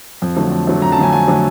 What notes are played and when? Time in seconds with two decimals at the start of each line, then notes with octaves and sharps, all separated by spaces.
0.22 F2
0.37 D3 F#3 A3
0.52 F2
0.67 D3 F#3 A3
0.82 F2 A#5
0.92 A5
0.98 D3 F#3 A3 G#5
1.13 F2 G#5
1.28 D3 F#3 A3